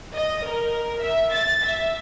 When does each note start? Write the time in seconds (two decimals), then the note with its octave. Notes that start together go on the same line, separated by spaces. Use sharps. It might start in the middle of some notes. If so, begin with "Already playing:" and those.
0.15 D#5
0.46 A#4
1.03 E5
1.34 A6
1.64 E5